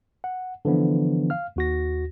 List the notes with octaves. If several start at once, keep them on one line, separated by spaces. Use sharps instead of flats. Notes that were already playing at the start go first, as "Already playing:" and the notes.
F#5
D3 E3 F3 B3 D4
F5 F6
D#2 F#4 A#6